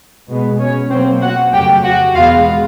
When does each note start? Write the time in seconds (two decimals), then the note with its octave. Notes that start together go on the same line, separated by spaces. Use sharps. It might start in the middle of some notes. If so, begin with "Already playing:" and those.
0.29 B2 G#3 B3
0.59 C#4 C#5
0.91 B2 F#3 A#3 C4 C5
1.22 F#4 F#5
1.53 F2 C#3 F#3 A3 G4 G5
1.84 F#4 F#5
2.15 E2 B2 G#3 B3 F4 F5